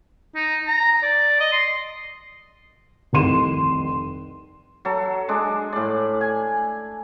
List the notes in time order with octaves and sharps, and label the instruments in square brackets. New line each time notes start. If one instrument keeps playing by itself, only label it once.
[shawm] D#4
A#5
D5
D#5
C6
[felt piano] F1 C2 D#3 C6 D#7 E7
[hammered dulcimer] F#3 A4
G#3 D4
A2 D5
G#5